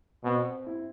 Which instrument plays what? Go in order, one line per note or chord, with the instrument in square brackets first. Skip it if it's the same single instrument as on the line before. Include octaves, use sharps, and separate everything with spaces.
[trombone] B2 [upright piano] C4
[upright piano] E4